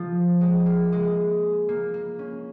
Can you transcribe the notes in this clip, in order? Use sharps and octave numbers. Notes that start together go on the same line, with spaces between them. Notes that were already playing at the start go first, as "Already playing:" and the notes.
Already playing: F3
G#3
A#3
G#3
A#3
A#3
C#4